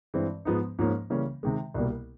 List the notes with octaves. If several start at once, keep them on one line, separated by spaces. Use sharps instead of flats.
G2 E3 G#3 C4
G#2 F3 G#3 B3 D#4
G#2 F3 A#3 C#4
C#3 E3 G3 A#3 C#4
C3 D#3 G#3
C2 B2 G3 A#3